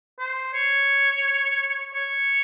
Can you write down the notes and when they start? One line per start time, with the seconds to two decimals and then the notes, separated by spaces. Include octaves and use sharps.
0.19 C5
0.54 C#5
1.94 C#5